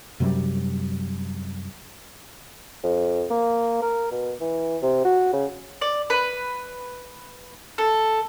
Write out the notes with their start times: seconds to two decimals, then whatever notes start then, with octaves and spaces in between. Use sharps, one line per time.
0.20 F#2 C3 F#3 G3
2.83 F2
3.31 A#3
3.82 A#4
4.11 B2
4.41 E3
4.82 C3
5.05 F#4
5.33 C#3
5.81 D5
6.10 B4
7.78 A4